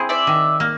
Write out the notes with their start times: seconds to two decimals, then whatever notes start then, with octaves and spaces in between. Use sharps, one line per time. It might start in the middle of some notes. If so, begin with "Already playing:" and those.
Already playing: C4 E4 G#4
0.09 D5 E5
0.27 D#3
0.60 A#3